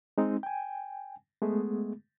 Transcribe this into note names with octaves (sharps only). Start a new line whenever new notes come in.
G#3 C4 D#4
G5 G#5
G#3 A3 B3 G#4